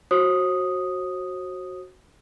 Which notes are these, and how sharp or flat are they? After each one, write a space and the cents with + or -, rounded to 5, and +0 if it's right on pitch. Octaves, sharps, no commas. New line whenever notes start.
F#4 +0 C5 +40 D#6 +0